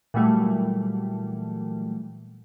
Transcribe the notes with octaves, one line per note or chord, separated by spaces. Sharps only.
A#2 E3 F#3 G3 A3